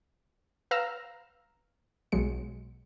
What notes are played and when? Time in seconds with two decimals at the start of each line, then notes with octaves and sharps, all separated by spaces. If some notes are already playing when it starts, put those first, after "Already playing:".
0.71 B4 F5 A#5 E6 F6
2.12 B1 F#3 G#3 C#7